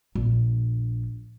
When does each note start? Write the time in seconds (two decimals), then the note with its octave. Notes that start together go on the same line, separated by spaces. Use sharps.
0.15 A#1